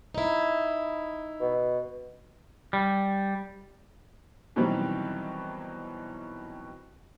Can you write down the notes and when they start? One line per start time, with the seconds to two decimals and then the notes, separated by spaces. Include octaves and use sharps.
0.14 D#4 E4
1.41 B2
2.73 G3
4.56 B2 D#3 E3 F#3 G3 C4